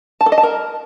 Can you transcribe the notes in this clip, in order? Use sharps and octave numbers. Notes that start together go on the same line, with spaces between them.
A5
A4
D#5
A5
A#4